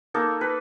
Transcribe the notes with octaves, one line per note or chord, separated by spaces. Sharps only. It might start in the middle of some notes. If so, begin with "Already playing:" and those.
A#3 D#4 A4
B4